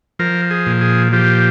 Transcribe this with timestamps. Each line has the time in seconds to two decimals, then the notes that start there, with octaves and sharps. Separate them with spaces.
0.19 F3 A#4
0.51 G#4
0.66 A#2
0.81 G#4
1.13 F3 G4